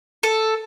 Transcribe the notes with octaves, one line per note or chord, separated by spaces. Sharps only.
A4